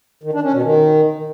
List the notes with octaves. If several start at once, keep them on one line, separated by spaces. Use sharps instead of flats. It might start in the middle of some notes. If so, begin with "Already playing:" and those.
D#3
D4
C#4
B2
D#3